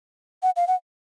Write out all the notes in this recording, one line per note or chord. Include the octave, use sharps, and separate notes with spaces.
F#5
F5
F#5